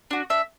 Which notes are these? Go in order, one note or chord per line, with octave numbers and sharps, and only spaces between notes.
D4 F#4
D4 E5